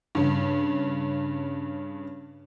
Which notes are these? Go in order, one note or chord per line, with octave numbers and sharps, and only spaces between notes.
G2 C#3